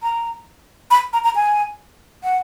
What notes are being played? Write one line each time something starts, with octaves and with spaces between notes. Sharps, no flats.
A#5
B5
A#5
A#5
G#5
F#5